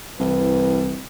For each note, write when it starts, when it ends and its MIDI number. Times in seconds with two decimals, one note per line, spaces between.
0.20 1.03 36
0.20 0.95 52
0.20 0.95 71